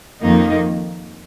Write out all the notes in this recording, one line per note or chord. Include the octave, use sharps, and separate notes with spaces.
F2 D#3 A#3 D#4